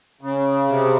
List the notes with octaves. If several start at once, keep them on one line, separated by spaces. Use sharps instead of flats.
C#3
C3